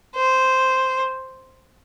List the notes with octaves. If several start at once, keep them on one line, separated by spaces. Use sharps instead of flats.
C5